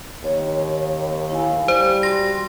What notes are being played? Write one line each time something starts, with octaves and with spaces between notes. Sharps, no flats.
D#2 C#5
E4 F5 G#5
G3 C5
F#4 C6 A#6